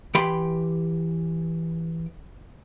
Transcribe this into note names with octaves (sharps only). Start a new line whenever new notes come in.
E3 G4 G5 B5 C6